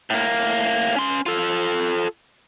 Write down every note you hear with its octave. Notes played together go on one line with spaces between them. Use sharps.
A2 A#3
C#4 C6
F4 A4